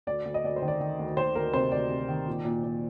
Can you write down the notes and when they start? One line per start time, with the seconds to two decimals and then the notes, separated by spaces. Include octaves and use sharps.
0.07 D2 D5
0.25 D2
0.34 D#5
0.44 D2 D5
0.56 C5
0.62 D#3
0.68 D5
0.80 D#3
0.99 D2
1.17 D#3 C5
1.35 D2 A#4
1.53 C3 C5
1.72 D2 D5
1.91 C3
2.08 D#3
2.27 A#2
2.45 A#2
2.64 A#2